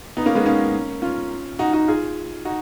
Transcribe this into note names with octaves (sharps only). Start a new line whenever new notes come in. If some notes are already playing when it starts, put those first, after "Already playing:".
B3 D#4
A#3 C#4
G#3 B3
A#3 C#4
C#4 F4
D#4 F#4
D#4 F#4
F4 G#4
D#4 F#4